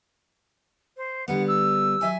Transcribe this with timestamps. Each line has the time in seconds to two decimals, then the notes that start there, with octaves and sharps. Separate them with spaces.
0.97 C5
1.28 D3 G3 B3 F#5
1.48 E6
2.01 F#3 E5 G#5